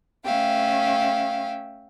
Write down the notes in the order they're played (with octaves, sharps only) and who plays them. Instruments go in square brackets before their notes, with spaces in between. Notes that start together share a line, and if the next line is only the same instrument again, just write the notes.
[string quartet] A3 C#4 E5 F5 G5